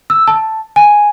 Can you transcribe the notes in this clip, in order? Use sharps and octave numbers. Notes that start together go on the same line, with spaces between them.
E6
A5
G#5